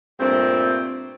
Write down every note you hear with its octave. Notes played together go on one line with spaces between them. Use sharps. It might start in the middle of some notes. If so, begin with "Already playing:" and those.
G2 A#2 A3 C4